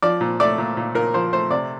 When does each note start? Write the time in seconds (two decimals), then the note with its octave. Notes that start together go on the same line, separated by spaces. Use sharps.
0.02 F3 D5
0.21 A#2
0.40 A3 D5
0.58 A#2
0.77 A#2
0.95 A#2 A#4
1.14 F3 C5
1.33 A3 C5
1.50 C3 D5